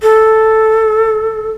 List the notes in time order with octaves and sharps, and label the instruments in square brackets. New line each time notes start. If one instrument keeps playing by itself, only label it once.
[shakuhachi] A4